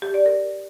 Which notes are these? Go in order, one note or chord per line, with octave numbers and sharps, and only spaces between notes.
G4
D5
A#4